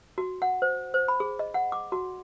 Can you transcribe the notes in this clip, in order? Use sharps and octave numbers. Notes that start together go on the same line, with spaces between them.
F#4
F#5
C5
C5
B5
G#4
D#5
F#5
D6
F#4